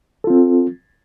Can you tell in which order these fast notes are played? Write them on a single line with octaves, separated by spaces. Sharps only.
A4 F4 C4